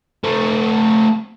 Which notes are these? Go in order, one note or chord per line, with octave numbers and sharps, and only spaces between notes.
A3 C4